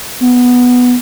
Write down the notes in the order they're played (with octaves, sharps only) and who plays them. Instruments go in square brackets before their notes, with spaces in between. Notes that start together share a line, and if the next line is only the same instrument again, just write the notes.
[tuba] B3